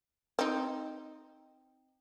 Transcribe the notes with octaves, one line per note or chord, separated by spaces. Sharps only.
C4 D#4